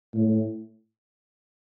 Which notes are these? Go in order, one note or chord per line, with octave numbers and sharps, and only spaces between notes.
A2